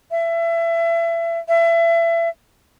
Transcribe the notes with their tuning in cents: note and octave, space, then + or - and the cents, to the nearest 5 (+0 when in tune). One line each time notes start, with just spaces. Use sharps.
E5 +30
E5 +30